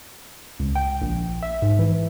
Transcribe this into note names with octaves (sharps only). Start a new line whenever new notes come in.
C#2
G5
A#1
E5
G#2
E3